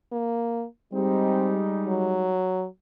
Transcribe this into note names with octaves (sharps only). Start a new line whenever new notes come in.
A#3
G3 G#3 C4 D#4
F#3